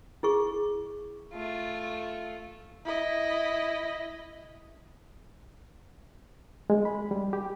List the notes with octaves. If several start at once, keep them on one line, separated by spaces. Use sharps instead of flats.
E4 G#4 C#6
A3 F4
E4 D#5
G#3
B5
G3
G4